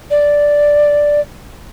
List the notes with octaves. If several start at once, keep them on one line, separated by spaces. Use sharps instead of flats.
D5